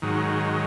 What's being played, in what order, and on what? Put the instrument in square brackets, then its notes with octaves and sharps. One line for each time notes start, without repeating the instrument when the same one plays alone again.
[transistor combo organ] G#2 D#3 F#3